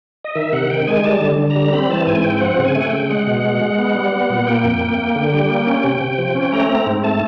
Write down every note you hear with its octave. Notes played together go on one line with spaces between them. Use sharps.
D#5
D#3 E5
C3 F#5
D#3 G5
G#3 G#5
G3 A5
D3
D3
A#5
G3
C4 B5
E3 A5
G#2 G#5
C4 G5
F3 F#5
C#3
G#5
A3
F#5
G5
C#3
G#3 F#5
B2
G#3
G#3
B3
G3
B3
A#2
A#3 G5
F2
A#3
A#3
D3
G3
A#3
C#4
C3
C3
F3
C#4
A3 A#5
C4 A#5
G#2
A3 A5